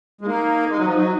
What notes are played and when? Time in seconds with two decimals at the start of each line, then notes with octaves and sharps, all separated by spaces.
0.21 G#3
0.26 A#3 D#4
0.69 G#3
0.78 F#3
0.86 F3
0.94 F#3